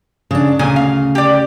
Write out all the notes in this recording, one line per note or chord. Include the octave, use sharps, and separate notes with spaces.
C#3 D4
D2 A#2 C#3 G#5
F5
G4 D5